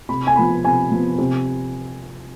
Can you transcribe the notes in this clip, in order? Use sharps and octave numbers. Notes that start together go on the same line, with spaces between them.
C3 B5
G#5
F3 B3 B5
C3 G#5
F3 B3
C3